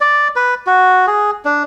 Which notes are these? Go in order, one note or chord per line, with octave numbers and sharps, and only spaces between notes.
D5
B4
F#4
G#4
D4